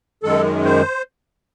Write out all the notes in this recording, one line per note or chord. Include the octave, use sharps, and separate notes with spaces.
F#2 D#3 G#3 A4
C5